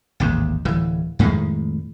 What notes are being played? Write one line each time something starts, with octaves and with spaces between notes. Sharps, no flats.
A1 D#2 G#2
D1 E3
F2 A2 D#3 G#3